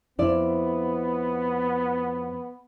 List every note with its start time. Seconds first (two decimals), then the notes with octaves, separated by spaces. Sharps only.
0.19 F2 B3 E4 D5